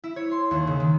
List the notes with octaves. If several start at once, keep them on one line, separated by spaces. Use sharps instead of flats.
E4
C#5
C6
D#2
C#3
D#3